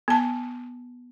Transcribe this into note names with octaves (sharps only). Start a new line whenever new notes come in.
B3 A5